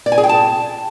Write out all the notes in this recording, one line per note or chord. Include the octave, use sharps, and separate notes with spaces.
D5
G#5
G#4
G5
A5